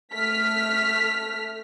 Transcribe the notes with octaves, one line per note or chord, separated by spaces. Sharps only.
A3 F6 B6